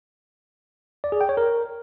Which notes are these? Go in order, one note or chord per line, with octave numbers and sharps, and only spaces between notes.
D5
G#4
G5
C#5
A#4